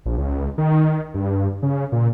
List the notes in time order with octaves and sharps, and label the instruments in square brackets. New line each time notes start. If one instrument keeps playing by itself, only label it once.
[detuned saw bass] A#1
C#2
D#3
G2
C#3
A#2